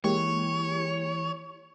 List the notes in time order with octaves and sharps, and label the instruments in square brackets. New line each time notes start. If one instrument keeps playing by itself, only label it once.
[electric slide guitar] E3 [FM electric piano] G#3 A#3 G4 [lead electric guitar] C#5